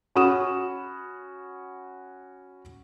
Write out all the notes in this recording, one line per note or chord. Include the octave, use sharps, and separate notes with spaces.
C#4 F#4 F#5 B5 D#6 E7